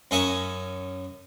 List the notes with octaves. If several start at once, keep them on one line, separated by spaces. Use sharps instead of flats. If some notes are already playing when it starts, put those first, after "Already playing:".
F#2 C#4 D#4 E5 C#6